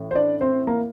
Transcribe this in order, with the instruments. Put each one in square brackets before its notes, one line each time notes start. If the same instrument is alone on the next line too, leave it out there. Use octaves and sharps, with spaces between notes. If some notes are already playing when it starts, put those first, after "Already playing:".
Already playing: [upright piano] A1 A2
C5
D4 D5
C4 C5
A#3 A#4